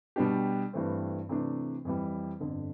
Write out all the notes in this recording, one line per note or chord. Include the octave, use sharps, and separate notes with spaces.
B2 G3 D4 G4
G2 E3 A3 C4
C3 E3 A3 D4
F2 E3 G3
G1 F2 D3